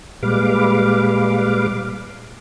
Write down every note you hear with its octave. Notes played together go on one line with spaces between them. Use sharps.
A#2 G3 G#3 B4 F5 D6